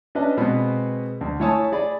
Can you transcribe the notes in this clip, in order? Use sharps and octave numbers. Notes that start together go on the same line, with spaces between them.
C#4 D4 B4 D#5 A5
B2 G#3 B3 C4 G#4 B4
D2
A3 E4 C#5 G#5 A5 D#6
G#4 D5 B5